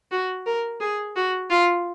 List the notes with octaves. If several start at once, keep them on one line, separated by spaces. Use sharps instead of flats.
F#4
A#4
G#4
F#4
F4